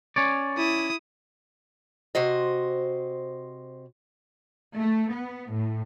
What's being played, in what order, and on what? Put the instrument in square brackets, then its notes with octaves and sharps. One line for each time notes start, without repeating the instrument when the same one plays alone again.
[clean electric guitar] C#4 C#5 D5
[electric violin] E4 D#6
[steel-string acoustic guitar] C3 F#4 C5 D#5
[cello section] A3
B3
A2